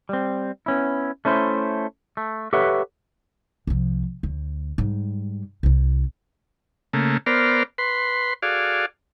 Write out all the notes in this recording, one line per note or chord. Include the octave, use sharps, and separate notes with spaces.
G3 C4
B3 C#4 E4
A3 C#4 E4 C5
A3
G4 A4 B4 C#5 E5 F#5
C2 F3
D2
G#2 G3
C2 E4
C#3 A3 A#3
B3 A#4 C5 D5 F6
B4 C6
F#4 G#4 A4 D5 F5